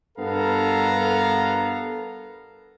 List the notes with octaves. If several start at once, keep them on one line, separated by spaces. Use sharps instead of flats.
G2 B3 A4 A#4 F5 A#5